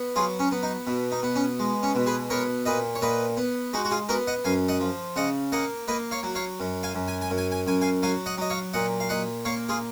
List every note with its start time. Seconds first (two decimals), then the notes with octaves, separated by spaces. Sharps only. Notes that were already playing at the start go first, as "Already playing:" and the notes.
Already playing: B3
0.16 F#3 F4 G#4
0.39 C#4
0.52 B3
0.63 D#4
0.87 B2
1.12 D#4
1.23 B3
1.36 C#4
1.59 G#3
1.83 C#4
1.95 B2
2.06 G#4 B4
2.30 B3 A#4 C#5
2.66 A#2 B4 D#5
2.95 C#5
3.01 A#2 B4 D#5
3.37 B3
3.73 G#3 D#4 F#4
3.85 F#4
3.91 F4 G#4
4.09 B3 F#4 A#4
4.27 D#5 F#5
4.44 F#2 F5 G#5
4.68 D#5 F#5
4.80 F3
5.16 C#3 D#5 F#5
5.52 A#3 D#5 F#5
5.88 A#3 B4 D#5
6.11 C#5 F5
6.23 F#3
6.35 C#5 F5
6.60 F#2
6.83 F5 G#5
6.95 F#2
7.08 G#5
7.22 G#5
7.30 F#2
7.38 G#5
7.52 G#5
7.67 F#2 G#5
7.81 F5 G#5
8.03 F#3 F5 G#5
8.26 D#5 F#5
8.38 F#3 D#5
8.50 C#5 F5
8.74 A#2 D#5 F#5
9.00 F5
9.09 A#2 D#5 F#5
9.45 A#3 C#5 F5
9.69 F4 G#4